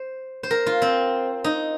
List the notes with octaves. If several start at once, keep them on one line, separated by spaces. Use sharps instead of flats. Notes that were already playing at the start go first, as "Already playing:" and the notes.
Already playing: C5
C5
A#4
F4
C4
D#4